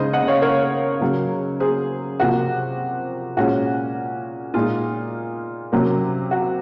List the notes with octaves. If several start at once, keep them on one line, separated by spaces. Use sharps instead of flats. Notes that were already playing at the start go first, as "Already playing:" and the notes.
Already playing: C#3 G#3 D#4 C5 D#5
D#5 F#5
C#5 F5
A#4 C#5
C#3 F#3 A#3
G#4 C5
C3 F3 A#3 F#4
A#2 G#3 C#4 F#4
A#2 G#3 D#4 F4
C3 F#3 A#3 C#4
F#4